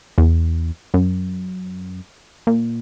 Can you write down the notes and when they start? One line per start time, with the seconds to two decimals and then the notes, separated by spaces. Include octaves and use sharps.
0.18 E2
0.94 F#2
2.47 A#2